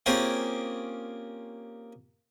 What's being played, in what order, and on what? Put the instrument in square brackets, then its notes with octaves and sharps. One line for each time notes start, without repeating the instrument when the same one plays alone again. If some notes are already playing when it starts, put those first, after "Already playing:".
[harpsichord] A#3 C4 C#4 F4 G4 G#4